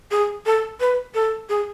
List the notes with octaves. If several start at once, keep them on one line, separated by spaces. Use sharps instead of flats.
G#4
A4
B4
A4
G#4